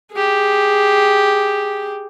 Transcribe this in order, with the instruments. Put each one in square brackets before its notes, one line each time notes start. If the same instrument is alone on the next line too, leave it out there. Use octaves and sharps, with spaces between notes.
[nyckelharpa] G4 G#4